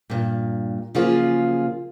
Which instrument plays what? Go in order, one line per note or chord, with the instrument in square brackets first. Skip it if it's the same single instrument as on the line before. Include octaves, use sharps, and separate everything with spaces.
[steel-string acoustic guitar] G2 A#2
C#3 F3 F#3 A#3 F4 G#4